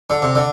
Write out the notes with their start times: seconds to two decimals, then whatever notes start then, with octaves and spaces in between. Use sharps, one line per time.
0.10 D3
0.22 C3
0.35 D3